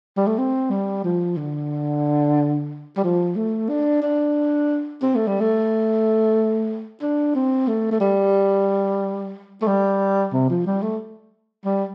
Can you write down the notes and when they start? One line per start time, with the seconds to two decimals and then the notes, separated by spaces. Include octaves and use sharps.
0.17 G3
0.27 A3
0.38 C4
0.70 G3
1.04 F3
1.37 D3
2.97 G3
3.04 F3
3.36 A3
3.69 D4
4.02 D4
5.02 C4
5.15 A3
5.27 G3
5.40 A3
7.01 D4
7.35 C4
7.68 A3
7.91 A3
8.00 G3
9.62 A3
9.67 G3
10.33 C3
10.49 F3
10.66 G3
10.82 A3
11.65 G3